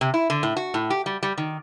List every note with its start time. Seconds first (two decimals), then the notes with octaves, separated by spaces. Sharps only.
0.01 C3
0.14 E4
0.30 D3
0.43 A2
0.57 F#4
0.74 A2
0.90 G4
1.06 G3
1.23 G3
1.38 D#3